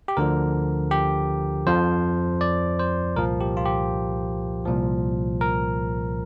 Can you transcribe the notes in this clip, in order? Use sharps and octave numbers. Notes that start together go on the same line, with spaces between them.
G4
D2 D3 F3 A#4
G4
F2 F3 C5
D5
C5
C2 A#2 F3 A#4
G4
F4
G4
C2 A#2 F3
A#4